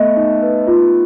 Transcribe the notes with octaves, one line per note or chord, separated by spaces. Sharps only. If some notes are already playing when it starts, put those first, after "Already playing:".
Already playing: A3 B3 D#5 E5
D#4
B4
F4